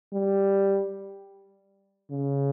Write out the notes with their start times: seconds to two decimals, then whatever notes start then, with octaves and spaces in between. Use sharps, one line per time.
0.14 G3
2.12 C#3